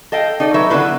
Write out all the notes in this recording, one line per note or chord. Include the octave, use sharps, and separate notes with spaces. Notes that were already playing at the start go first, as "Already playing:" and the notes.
A4 D#5 F5 G5
D#4 A4 D5
F#3 B4 E5
D3 B3 E4 F4 B4